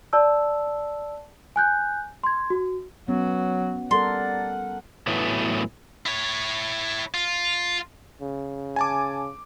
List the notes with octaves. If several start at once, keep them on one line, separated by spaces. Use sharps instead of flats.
D5 A5 E6
G#5 F#6 G6
C6 G#6
F#4
F#3 B3 C#4 F#4
G3 A4 A#4 D5 F#5 C6
A2 E3 F#3 A3 B3
E4 C#5
F4
C#3
G#5 A5 D6